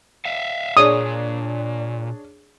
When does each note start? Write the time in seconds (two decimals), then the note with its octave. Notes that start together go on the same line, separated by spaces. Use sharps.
0.25 E5 F5
0.77 A#2 D4 G#4 C#5 D#6